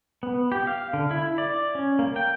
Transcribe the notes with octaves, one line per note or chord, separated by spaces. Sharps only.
B3
G4
F5
D3
E4
D5
C#4
A#3
G5